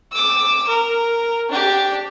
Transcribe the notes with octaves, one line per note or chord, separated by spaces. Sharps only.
D6 E6
A#4
D4 G4